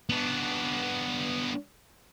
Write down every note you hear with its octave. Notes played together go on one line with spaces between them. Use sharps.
B3 D4